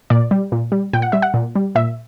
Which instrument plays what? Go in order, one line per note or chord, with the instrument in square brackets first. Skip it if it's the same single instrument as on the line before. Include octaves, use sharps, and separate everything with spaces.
[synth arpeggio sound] A#2 D5
G3
A#2
G3
A#2 G5
F#5
G3 E5
F#5
A#2
G3
A#2 E5